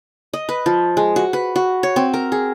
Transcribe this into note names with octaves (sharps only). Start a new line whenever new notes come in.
D#5
B4
F3
G#3
F#4
B4
F#4
C#5
C4
A#4
G#4